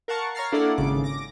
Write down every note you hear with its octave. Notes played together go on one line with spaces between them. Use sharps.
A#4 F5 F#5 A5 C#6
C#5 A#5 F6 A6 C7
A#3 D4 E4 A4 D5 F#5
G#1 C#3 D6
D6 A#6